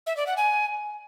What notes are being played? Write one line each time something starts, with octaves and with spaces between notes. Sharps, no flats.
E5
D5
F#5
G#5